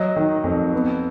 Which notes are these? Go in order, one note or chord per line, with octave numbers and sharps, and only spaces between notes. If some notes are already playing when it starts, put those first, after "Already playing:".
Already playing: F#3 D#5
D#3
F2
B3